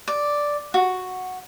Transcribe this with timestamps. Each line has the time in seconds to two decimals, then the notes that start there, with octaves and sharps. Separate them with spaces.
0.08 D5
0.74 F#4